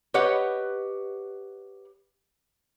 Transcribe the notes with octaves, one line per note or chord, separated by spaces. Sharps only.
G4 B4 C#5 D#5 F#5